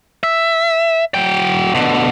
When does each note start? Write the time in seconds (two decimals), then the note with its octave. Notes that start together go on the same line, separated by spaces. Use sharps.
0.23 E5
1.14 F#3 G5
1.75 B2 D3